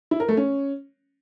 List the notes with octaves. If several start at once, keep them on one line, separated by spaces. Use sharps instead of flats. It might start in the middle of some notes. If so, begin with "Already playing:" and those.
E4
A#4
A3
C#4